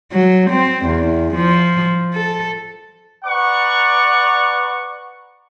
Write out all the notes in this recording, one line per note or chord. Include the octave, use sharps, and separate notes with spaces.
F#3
C4
E2
F3
A4
B4 D5 F#5 A#5 C#6